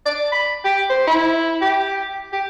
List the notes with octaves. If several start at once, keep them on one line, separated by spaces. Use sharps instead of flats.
D5
B5
G4
C5
E4
G4
G4